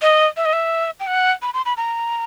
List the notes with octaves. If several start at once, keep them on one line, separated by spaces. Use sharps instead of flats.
D#5
E5
D#5
E5
G5
F#5
B5
C6
B5
A#5